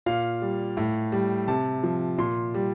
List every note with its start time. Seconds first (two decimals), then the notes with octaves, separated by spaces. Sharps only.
0.06 A#2 F5
0.42 G3
0.77 A2
1.12 G3
1.48 C3 A5
1.83 F3
2.18 A#2 C6
2.54 G3